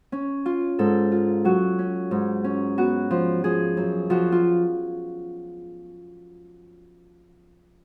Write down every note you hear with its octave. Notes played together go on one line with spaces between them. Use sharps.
C#4
F4
G#2 A4
F4
F#3 F#4
C#4
G#2
C#4
B3 F#4
F3
F3 G#4
F#2
F3 F#4
F4